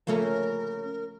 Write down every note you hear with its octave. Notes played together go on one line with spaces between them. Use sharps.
C#3 F3 A3 A#3 C#4 A4 A#4